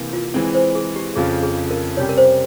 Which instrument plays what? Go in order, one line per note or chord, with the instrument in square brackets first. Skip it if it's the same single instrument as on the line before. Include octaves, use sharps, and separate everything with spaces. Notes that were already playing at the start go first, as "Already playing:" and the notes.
Already playing: [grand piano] C3 E3 A#3
[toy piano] F4
[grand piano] E3 G#3 C4
[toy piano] C5
G#4
G4
[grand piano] F2 C#3 F3 [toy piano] G#4
[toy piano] G#4
A#4
[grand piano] C3 G3 C#4 G4 [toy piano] C#5
[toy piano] A#4
C5